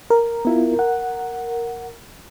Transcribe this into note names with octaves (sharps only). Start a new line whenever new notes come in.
A#4
B3 E4 F4
F#5